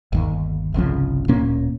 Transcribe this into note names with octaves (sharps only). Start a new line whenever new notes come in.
G1 D#2
G1 C2 C#3 F3
D1 A#2 A#3 C#4